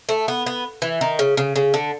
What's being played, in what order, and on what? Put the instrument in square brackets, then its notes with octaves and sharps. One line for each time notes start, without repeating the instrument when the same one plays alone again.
[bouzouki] A3
B3
B3
E3
D#3
C#3
C#3
C#3
D3